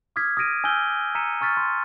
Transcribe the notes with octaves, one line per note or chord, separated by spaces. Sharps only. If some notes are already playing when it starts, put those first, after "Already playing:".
D6 D#6 F6 G#6 B6
D#6 F6 A#6 D7 D#7
G#5 E6 F6 G6 G7
A#5 E6 B6 C#7 D#7 E7
G#5 C#6 F6 A6 B6
C6